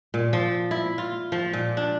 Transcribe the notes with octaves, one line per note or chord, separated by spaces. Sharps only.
A#2
F3
E4
F4
F3
A#2
D4